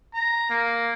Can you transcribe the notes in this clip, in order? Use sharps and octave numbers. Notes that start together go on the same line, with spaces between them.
A#5
A#3